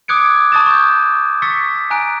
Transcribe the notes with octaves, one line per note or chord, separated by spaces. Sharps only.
D6 D#6 F#6 G#6 C#7 D7
A5 C#6 D#6 A6 E7
C#6 G6
C#6 E6 A6 B6 C#7
G#5 A#5 F#6 D7